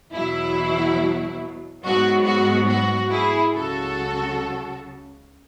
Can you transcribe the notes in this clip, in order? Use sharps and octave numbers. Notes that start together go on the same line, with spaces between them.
E2 B2 F#3 E4
G#2 F#3 B3 F#4
F#4
F#4
E4 G#4
C#2 C#3 F#3 F#4 A4